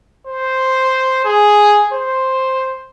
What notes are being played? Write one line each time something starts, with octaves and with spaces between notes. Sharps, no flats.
C5
G#4
C5